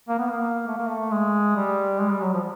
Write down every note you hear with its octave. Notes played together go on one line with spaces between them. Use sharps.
A#3
B3
A#3
A3
A#3
A3
G#3
G3
G#3
G3
F#3
F3